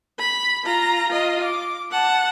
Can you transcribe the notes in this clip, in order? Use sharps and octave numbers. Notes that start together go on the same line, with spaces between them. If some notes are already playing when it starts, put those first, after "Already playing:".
B5
F4 A#5
F4 D#5
D6
F#5 A5